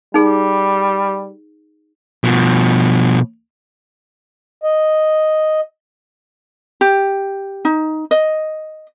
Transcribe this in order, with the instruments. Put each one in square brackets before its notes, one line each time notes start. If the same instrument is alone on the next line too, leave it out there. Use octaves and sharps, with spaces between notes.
[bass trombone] G3 [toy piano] D#4 G#4
[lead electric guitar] B2 F3
[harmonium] D#5
[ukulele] G4
D#4
D#5